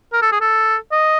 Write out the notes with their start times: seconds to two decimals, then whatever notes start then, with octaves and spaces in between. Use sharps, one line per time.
0.13 A#4
0.22 A4
0.32 G#4
0.41 A4
0.92 D#5